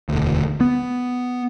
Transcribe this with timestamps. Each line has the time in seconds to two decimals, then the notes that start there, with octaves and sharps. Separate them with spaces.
0.09 E1 D2
0.60 B3